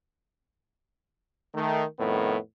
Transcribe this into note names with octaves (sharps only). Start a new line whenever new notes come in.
D#3 A3
F2 A2 D#3 B3